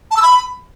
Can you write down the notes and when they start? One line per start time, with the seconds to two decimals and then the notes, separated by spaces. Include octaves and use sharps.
0.11 A5
0.17 E6
0.22 B5